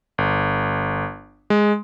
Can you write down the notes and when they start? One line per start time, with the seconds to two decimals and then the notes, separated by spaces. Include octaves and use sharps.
0.18 G1
1.50 G#3